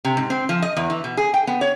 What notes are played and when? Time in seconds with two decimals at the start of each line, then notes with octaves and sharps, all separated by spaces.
0.05 C3
0.17 G#2
0.30 C4
0.49 F3
0.62 D#5
0.77 E2
0.90 E3
1.04 B2
1.17 G#4
1.34 G5
1.47 B3
1.61 C#5